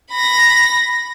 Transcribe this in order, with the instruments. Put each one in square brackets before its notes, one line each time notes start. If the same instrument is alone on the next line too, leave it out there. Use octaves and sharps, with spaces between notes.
[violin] B5 A#6